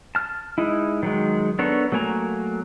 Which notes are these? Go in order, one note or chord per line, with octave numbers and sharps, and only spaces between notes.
A5 F6
G#3 D#4 E4
D#3 F#3 G#3
B3 D4 A4 A#4 C#5
F#3 A3 A#3 G#5 A#5